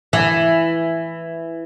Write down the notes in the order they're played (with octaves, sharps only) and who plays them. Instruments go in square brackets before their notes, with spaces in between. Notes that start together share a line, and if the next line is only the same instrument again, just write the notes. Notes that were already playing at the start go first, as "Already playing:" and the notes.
[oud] E3